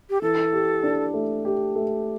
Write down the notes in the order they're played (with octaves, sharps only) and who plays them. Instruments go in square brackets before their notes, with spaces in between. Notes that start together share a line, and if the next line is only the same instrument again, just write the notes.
[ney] G4
[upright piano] E3 [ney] A4
[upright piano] G4
D4
A3
G4
A3